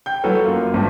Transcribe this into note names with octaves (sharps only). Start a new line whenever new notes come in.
G5 G6
F#3 A3 E4 F#4 A4 B4
F#2 A#3 F4
G#1 G2